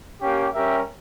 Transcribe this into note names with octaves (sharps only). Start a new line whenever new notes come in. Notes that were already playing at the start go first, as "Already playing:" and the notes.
A#3 C#4 G4
G3 C#4 G4 A#4 E5